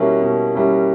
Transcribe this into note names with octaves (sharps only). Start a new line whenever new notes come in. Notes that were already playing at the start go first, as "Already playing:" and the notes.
Already playing: B2 G3 A#3 C#4 E4
B2
G3 A#3 C#4 E4